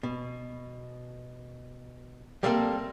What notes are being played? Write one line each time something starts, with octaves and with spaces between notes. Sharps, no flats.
B2
G3 A3 A#3 C4 A4